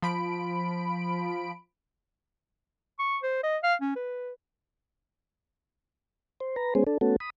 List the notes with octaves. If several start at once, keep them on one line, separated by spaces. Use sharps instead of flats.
F3 B5 D7
C#6
C5
D#5
F5
C#4
B4
C5
B4 A#5
G#3 B3 C#4 G#4 C5
D4 A4
A3 B3 C#4 F#4 A4
B5 D#6